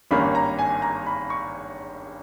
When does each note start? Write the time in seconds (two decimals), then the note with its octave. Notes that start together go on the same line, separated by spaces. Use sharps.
0.11 G#1 G2 D#3 A#3 C#4 B5
0.35 A#5
0.59 G#5
0.82 A#5
1.06 B5
1.30 C#6